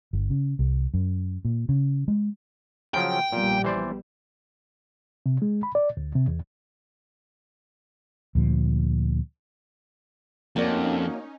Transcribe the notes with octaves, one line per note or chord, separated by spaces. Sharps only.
G1
C#3
C2
F#2
A#2
C#3
G#3
C#3 F3 F#3 G5
A#1 A#2 G3 B3
E3 C5 D5
C3
G#3
B5
D5
D2
C3
E2
D2 A#2 F3
F2 A#3 C#4 D#4 F#4 D5